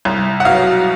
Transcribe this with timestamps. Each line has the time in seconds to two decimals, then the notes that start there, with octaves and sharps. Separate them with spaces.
0.05 C2
0.40 F#5
0.45 B2 F5
0.51 F#3